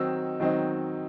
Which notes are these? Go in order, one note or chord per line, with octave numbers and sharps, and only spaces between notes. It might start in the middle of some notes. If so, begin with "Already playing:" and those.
Already playing: D#3 F#3 C4 D#4 E6
D#3 F#3 C4 D#4